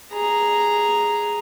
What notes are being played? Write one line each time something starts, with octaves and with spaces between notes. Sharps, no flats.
G#4 A#5